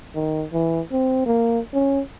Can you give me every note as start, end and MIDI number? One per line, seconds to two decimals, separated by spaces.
0.15 0.44 51
0.53 0.80 52
0.92 1.26 60
1.26 1.59 58
1.73 2.01 61